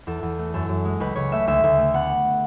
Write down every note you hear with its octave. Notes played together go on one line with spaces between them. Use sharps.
E2 A4
E2
A3
F#2 A4
F#2
G#3
C#2 B4
C#2 C#5
A3 E5
D2 E5
D2
A3
B3 F#5